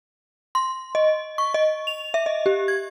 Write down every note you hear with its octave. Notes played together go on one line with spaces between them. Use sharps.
C6
D#5
C#6
D#5
F7
E5
D#5
G4
G#6